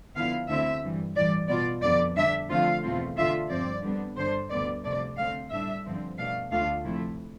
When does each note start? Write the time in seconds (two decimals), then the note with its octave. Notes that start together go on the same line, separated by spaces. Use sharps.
0.16 D3 F3 B3 E4 F5
0.49 D2 D3 A3 C4 E4 E5
0.83 G2 E3 G3
1.16 A2 E3 G3 D5
1.49 B2 B3 F4 D5
1.83 F2 D3 F3 B3 D5
2.16 D3 G3 D4 E5
2.50 D3 F3 A3 C4 F4 F5
2.84 E2 B2 A3 C4 F4
3.17 D3 A3 D4 F4 E5
3.50 G2 F3 C4 D5
3.84 D3 G3 B3 D4
4.17 G2 D3 G3 D4 C5
4.51 D2 D3 G3 B3 D5
4.85 C3 F3 A3 D5
5.17 D3 A3 C4 F5
5.51 A2 G3 D4 E5
5.85 G2 D3 F3 C4
6.18 B2 A3 D4 F5
6.51 D2 D3 A3 D4 F4 F5
6.85 C3 F3 A3 E4